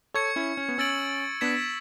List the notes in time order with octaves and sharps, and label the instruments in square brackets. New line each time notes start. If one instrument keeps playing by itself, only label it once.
[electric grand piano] A4 C#5 [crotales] C#6 G#6 C#7
[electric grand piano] C#4 E4
C#4
B3
[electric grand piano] C#4 [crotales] E6 A6 D7 F#7
[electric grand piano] B3 D4 [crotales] G#6 B6 E7